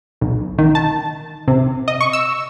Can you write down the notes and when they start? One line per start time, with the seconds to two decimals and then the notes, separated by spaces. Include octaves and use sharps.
0.21 B1
0.59 D#3
0.75 A5
1.48 C3
1.88 D#5
2.01 C#6
2.13 E6